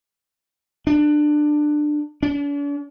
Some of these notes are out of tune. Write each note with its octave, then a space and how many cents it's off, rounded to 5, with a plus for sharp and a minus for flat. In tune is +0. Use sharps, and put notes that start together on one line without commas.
D4 +20
D4 -45